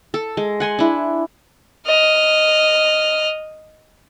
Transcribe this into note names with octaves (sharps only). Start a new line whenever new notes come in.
A4
G#3
F#5 G#5 C6
D4 E4
D#5 F6